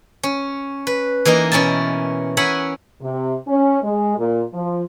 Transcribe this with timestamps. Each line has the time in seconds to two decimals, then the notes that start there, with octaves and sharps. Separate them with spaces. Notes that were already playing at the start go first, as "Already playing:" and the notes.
0.23 C#4
0.87 B4
1.25 E3 A#3 D#4 A#4 D#5
1.52 B2 C#4 E4 A#4 A5
2.37 C#4 A#4 E5 F#5 G#5 B5
3.02 C3
3.47 C#4
3.83 G#3
4.18 A#2
4.53 F3